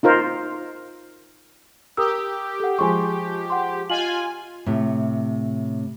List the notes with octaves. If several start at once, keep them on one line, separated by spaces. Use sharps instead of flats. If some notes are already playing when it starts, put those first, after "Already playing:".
D#4 F4 A#4 C5
G4 A#4 D#6 E6
A4 F#5
F3 G#3 G#5 C6 C#6
F#5 C6
F4 D#5 G#5 F#7
A2 C3